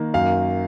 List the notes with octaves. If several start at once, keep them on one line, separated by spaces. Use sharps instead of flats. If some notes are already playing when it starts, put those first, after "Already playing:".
Already playing: D#3 A#3
F#2 F5